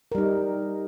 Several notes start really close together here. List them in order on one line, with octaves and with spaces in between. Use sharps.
A#4 G3 D#4